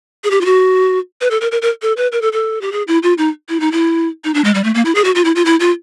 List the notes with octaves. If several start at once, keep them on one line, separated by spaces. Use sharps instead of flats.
G#4
G4
F4
F#4
B4
A4
A#4
A#4
A#4
A4
B4
A#4
A4
A4
G4
G#4
E4
F4
D#4
E4
D#4
E4
D#4
D4
G#3
G3
A3
A#3
E4
G#4
F#4
F4
E4
F4
E4
F4